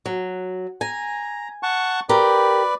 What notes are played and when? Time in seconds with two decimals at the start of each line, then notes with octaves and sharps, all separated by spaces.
0.06 F#3
0.81 G#5 A#5
1.63 F#5 A5 C#6
2.09 G4 A#4 B4 D5